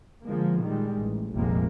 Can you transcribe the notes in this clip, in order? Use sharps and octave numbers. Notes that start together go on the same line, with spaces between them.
D3 F3 G#3 A#3
A#2 D#3 G3 G#3
A1
F1 A#1 C3 G3 G#3 A#3